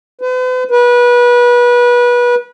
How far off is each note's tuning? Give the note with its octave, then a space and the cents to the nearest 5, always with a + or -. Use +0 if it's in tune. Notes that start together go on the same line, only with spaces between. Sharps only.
B4 +45
B4 -25